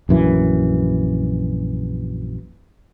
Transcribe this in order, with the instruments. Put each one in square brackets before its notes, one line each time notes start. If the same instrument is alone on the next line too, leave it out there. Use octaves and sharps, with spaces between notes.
[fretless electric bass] A#1 F#2 E3